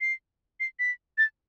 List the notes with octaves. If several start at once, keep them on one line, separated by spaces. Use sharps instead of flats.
C7
C7
B6
A6